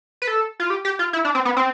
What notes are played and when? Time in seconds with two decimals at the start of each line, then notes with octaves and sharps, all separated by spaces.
0.22 B4
0.27 A4
0.60 F4
0.70 G4
0.85 G4
0.99 F4
1.13 E4
1.25 D4
1.35 C4
1.45 B3
1.57 C4